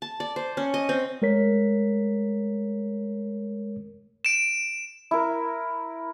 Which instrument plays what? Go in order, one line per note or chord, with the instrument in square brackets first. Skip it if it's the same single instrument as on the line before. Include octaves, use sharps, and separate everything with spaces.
[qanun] A5
D5
C5
C#4
D#5
C4
[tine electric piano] G#3 A3 A#4 C#5 B6
[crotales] D7 E7
[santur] E4 A#4